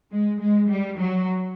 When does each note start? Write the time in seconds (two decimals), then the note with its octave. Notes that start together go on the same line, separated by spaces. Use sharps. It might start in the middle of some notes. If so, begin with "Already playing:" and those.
0.12 G#3
0.40 G#3
0.69 G3
0.97 F#3